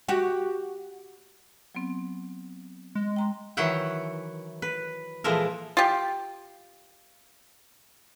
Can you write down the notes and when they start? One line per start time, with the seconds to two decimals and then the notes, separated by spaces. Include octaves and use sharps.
0.08 F#4 G4
1.75 F#3 B3 C4
2.95 G#3
3.16 G5 A#5 C6
3.57 D#3 E3 F#3 E4 F#5 G5
4.62 B4
5.24 A#2 E3 F3 G#3 A4 A#4
5.77 F4 G4